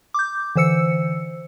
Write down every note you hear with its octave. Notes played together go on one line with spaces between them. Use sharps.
D6 G6
D3 E3 C5 E6 C#7